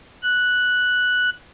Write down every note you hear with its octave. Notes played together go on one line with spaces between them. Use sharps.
F#6